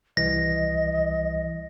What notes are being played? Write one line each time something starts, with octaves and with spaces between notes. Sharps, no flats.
C2 E3 G3 D#5 A#6